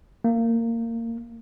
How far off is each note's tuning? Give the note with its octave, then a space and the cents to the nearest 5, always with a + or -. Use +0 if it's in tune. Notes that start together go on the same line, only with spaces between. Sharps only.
A#3 -20